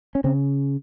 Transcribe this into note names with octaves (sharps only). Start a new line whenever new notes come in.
C#4
C#3 C4